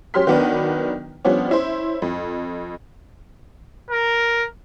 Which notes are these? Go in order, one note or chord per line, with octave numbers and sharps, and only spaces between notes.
F#3 C#4 G4 C6 F6 B6
D#3 F#3 B3 D4 B4
F3 G3 B3 C#4 D4
C#4 E4 C5
F2
A#4